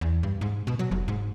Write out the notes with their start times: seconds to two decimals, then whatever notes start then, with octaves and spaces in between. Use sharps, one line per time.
0.01 E2
0.23 G2
0.41 G#2
0.67 B2
0.79 F#3
0.91 F1
1.08 G#2